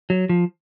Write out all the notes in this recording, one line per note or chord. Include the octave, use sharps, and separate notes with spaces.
F#3
F3